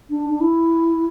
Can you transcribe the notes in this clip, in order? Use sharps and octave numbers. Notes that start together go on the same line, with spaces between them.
D4
D4
E4